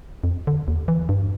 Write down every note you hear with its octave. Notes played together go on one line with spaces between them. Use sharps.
F2
D3
D#2
E3
G2